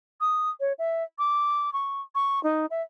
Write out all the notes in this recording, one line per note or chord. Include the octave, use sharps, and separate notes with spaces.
D#6
C#5
E5
D6
C#6
C#6
D#4
E5